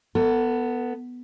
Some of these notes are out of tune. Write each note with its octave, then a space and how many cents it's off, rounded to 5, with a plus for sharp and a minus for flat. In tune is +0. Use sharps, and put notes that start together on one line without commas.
B3 +0 A4 +30